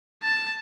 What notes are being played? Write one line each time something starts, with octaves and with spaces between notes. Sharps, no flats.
A5